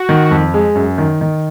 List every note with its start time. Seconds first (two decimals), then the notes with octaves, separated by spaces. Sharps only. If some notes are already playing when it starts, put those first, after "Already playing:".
Already playing: F#4
0.09 D#3
0.31 F2
0.54 G#3
0.75 F#2
0.98 D#3
1.21 D#3